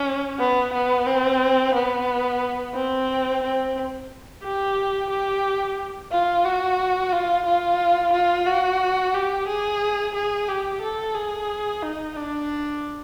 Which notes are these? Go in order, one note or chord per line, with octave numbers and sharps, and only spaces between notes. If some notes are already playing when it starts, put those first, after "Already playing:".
Already playing: C#4
B3
B3
C4
B3
C4
C4
G4
G4
F4
F#4
F4
F4
F4
F#4
G4
G#4
G#4
G4
A4
G#4
D#4
D4